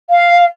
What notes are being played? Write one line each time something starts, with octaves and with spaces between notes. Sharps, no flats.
F5